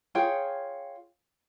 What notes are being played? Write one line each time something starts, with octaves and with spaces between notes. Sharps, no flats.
F4 G#4 C#5 G5